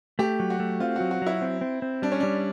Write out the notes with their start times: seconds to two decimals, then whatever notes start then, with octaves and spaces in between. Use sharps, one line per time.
0.19 A3 G4
0.40 F#3
0.50 F#4
0.60 A3
0.80 C4 F4
0.96 F#3 F#4
1.11 F#4
1.22 F#3 E4
1.42 C4
1.61 C4
1.82 C4
2.02 G3 D4
2.12 C#4
2.20 G3 D4